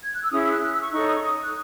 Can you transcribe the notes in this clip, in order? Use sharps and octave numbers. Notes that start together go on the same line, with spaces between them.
G#6
F#6
E6
C#4 E4 G#4 D#6
E6
F#6
F#6
E6
C#6
D#4 A4 C#5 C#6
D#6
C#6
D#6
F#6